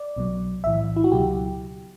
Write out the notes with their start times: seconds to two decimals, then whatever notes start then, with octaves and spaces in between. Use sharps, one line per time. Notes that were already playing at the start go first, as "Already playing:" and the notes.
Already playing: D5
0.16 B1 B2 F#3
0.64 B1 A2 E3 E5
0.96 E4
1.04 F#4
1.12 C#2 B2 F#3 G4